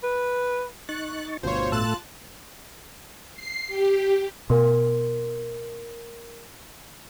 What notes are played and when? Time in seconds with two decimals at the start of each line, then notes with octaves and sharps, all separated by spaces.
0.03 B4
0.89 D#4 C#6 F#6 A6
1.43 G1 D2 B2 B3 F4 C5 C#5
1.72 A2 A3 A5 E6 F#6 A6
3.34 C7
3.68 G4
4.50 B2 A#4 C6